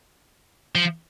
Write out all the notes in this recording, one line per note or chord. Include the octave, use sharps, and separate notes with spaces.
F3